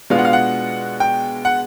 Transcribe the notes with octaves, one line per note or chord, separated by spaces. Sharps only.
B2 G#3 B3 D4 F4 F5
F#5
F5
F#5
G5
F#5